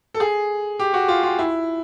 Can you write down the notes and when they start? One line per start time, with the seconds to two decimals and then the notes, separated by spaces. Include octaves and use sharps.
0.14 A4
0.20 G#4
0.79 G4
0.94 F#4
1.08 F4
1.23 F4
1.39 E4